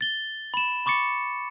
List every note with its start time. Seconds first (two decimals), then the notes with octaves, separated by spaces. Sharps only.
0.01 A6 G7
0.54 B5 E7
0.86 B5 C#6 D6 A6 C#7